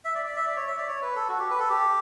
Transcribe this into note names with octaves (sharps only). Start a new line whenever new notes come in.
E5
D5
D5
E5
D5
C#5
E5
D5
C#5
B4
A4
F#4
G4
B4
A4
G4